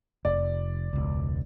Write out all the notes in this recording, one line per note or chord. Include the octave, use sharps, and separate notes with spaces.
F1 D5
E1 C#2